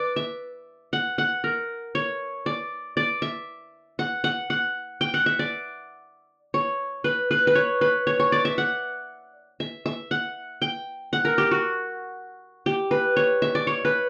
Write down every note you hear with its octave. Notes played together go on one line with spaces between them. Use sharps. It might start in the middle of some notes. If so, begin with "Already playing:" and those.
Already playing: B4 D5
E5
F#5
F#5
A#4
C#5
D5
D5
E5
F#5
F#5
F#5
G5
F#5
E5
D5
C#5
B4
B4
B4
C#5
B4
C#5
C#5
D5
E5
F#5
E5
E5
F#5
G5
F#5
A#4
G4
F#4
G4
B4
C#5
E5
D5
C#5
B4